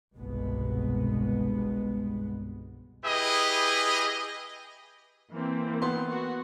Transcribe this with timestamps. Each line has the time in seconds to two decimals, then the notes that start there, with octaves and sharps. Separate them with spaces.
0.15 G1 C2 B2 G#3 B3
3.05 E4 G4 G#4 B4 D#5
5.30 E3 A#3 C4
5.82 B3 C6
6.11 F#4